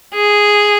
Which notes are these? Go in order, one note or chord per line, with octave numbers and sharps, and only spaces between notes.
G#4